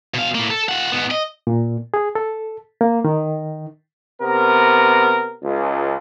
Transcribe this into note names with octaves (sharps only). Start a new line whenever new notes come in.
B2 F5
A2 A#3
A4
F4 F#5
G#2 B3
D#5
A#2
G#4
A4
A#3
D#3
C3 B3 A#4
C#2